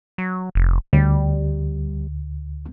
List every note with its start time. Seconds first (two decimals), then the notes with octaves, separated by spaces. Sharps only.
0.18 F#3
0.55 F1
0.93 D2 G3